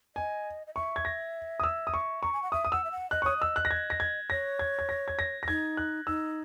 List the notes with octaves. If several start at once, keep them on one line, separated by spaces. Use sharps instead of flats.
D#5 G#5
D#5
E5 C#6
G#6
A#6
D#6
E6
D#6
C#6
A#5 C#6
G#5
F#5
E5 D#6
D#6
F#5 E6
E5
F#5
D#5 F#6
C#5 C#6 D#6
D#5 E6
F#6
A#6
G#6
A#6
G#6
C#5 A#6
G#6
G#6
A#6
G#6
A#6
A#6
D#4 G#6
F#6
D#4 E6